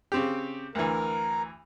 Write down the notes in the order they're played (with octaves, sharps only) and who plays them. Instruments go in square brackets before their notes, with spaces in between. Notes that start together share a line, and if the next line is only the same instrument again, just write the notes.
[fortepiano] C#3 C4 G4
[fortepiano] D2 E3 [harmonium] A#4